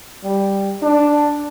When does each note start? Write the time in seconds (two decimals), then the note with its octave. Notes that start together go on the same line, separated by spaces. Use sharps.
0.24 G3
0.82 D4